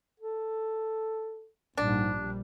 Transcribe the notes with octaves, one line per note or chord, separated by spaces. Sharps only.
A4
A#1 G#2 G3 D4